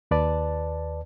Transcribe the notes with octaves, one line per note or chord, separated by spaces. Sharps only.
D#2 B4 D5 A5